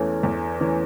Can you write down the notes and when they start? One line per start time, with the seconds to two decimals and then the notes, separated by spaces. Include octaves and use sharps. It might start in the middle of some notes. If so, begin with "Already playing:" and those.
Already playing: E2 E3 A3 C#4
0.23 E2
0.60 E3 A3 C#4